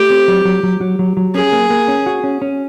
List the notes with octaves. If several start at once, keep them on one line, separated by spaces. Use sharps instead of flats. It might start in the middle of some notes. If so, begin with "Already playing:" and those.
Already playing: A3 G4
C4
F#3
F#3
F#3
F#3
F#3
F#3
C#4 G#4
A#3
A#3
C#4
F#4
C#4
C#4